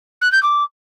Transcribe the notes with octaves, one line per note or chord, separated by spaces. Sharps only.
F#6
G6
D6